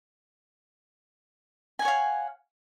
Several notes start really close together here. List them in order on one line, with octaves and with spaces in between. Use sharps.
G#5 F#5 C#5 F5